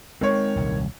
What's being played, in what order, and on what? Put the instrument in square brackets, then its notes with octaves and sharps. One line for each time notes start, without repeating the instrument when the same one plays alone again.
[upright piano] D#3 C#5 [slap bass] G#3 C4
[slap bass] D#1 C2